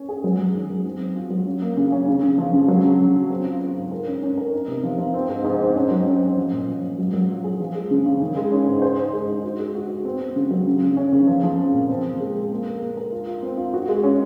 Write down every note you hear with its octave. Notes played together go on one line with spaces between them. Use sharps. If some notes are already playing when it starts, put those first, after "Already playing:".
Already playing: C#4
G#4
F#3
F#3
D#3
F#3
C4
C4
F4
F#3
C#4
A#3
C#3
C#4
C#3
C#3
F3
C#3
F#3
C#3
C#3
C#3
C4
F4
C4
G#2
A#4
C#4
C#4
A#4
D#4
C3
F3
F3
C4
G#2
G#2
C4
C#4
F#3
C#4
C#4
F3
A#2
F3
F3
F#3
F#3
F4
G#4
F3
G#3
C#3
C#3
D#3
G#3
C#4
G#2
C5
C5
G#3
D#4
F#4
G#3
F#4
F#4
C4
C4
C#3
F#3
C#3
C#3
C#4
C#3
F3
F3
C4
A#2
C4
F3
G#3
G#3
A#3
A#4
A#3
A#4
F4
F4
C4
F4
F#4
G#3
C#4